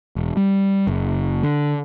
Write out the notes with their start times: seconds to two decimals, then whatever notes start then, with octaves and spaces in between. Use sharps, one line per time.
0.16 E1
0.37 G3
0.87 F#1
1.43 D3